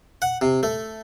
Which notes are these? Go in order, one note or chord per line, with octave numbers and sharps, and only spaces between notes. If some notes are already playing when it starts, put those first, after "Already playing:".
F#5
C3
A3